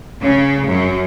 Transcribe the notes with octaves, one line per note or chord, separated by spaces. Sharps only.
C#3
F#2